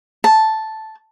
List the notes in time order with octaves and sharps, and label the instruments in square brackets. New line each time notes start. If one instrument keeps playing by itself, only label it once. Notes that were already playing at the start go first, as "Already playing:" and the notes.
[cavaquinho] A5